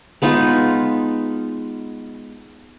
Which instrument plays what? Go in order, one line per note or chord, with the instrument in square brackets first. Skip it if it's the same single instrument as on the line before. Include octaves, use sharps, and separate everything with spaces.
[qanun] G#3 B3 D#4 F4